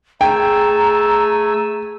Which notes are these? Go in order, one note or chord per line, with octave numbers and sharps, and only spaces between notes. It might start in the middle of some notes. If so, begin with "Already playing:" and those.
A3 G#4 G5 G#5 A#5 E6